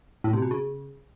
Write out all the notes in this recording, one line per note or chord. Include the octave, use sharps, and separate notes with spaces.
A2
C3
B2
C#3